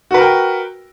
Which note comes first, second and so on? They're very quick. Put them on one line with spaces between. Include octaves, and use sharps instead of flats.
F#4 B4 A#4 G5